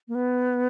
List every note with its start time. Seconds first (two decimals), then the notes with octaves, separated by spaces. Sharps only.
0.08 A#3
0.15 B3